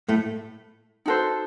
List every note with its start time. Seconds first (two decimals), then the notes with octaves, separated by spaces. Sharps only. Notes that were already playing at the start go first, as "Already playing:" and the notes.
0.09 A2 A3
1.06 D#4 F#4 A4 C5